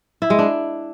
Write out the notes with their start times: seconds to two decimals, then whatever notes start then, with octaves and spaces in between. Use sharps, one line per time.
0.22 E4
0.30 G#3
0.39 D4